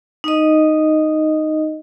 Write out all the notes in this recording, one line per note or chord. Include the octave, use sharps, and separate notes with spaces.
D#4 D#5